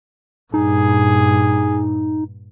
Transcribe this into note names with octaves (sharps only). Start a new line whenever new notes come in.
G2 A#2 D#4 G#4